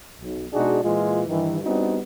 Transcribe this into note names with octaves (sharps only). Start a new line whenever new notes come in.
B1
B2 G#3 D4 D#4 F#4 G#4
A#2 E3 G#3 F4
G2 D#3 E3
G3 B3 C4 D4 D#4 F#4